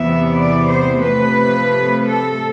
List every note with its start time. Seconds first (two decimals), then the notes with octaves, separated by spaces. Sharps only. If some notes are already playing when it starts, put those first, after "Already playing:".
Already playing: E2 C3 E3 B3 E5
0.34 D5
0.68 C5
1.03 C3 F3 A3 B4
2.06 A4